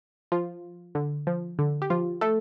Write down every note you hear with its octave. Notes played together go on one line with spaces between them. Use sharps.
F3 F4
D3
F3
D3
G4
F3 F4
A3 A4